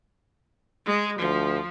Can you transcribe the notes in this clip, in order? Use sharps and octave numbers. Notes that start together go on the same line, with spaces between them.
G#3
D2 F3